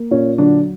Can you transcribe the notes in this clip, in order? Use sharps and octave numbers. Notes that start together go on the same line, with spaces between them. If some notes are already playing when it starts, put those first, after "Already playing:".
Already playing: A#3
A#2 C#4
D3 F#3 D4